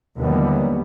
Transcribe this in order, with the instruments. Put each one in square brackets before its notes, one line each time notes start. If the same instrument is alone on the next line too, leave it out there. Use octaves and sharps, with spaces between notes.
[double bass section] D#2 D3 E3 F#3 G3 B3